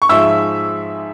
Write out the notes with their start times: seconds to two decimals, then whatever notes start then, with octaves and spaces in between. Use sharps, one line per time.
0.02 C#6
0.09 G#2 F3 G#3 E5 E6